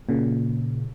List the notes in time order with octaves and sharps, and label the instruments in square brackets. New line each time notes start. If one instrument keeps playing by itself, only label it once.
[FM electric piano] A#2 C#3